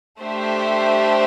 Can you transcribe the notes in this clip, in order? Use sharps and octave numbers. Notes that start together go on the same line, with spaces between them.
A3 D4 G4 C5 E5